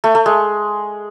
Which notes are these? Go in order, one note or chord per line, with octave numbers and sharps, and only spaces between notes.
A3
A3
G#3